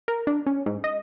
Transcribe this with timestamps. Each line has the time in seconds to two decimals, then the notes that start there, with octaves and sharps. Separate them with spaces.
0.08 A#4
0.27 D4
0.46 C#4
0.66 G#2
0.84 D#5